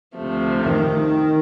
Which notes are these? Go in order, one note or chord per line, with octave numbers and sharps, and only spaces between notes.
D2 C3 F3 A3
D#3